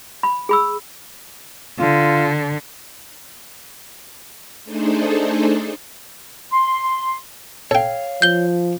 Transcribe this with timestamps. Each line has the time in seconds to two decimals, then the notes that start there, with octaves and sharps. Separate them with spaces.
0.23 B5
0.49 G#4 B5 E6
1.79 D3 F4
4.64 A3 D4 D#4 G#4 A4 C5
6.52 C6
7.71 A4 C#5 F5 G5
8.22 F3 G6 G7